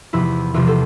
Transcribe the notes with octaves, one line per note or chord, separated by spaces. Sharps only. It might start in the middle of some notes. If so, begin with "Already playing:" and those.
E2 C3 F3 E4
E2 C3 F3 F4
A4